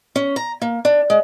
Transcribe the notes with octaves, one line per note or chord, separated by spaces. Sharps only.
C#4
A#5
A#3
D4
G#3